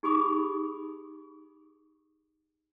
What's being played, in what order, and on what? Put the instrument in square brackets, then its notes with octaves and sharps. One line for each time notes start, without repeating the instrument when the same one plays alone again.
[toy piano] D#4 G4 G#4 B5 D6 D#6